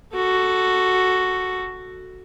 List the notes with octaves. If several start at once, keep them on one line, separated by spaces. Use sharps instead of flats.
F#4 A4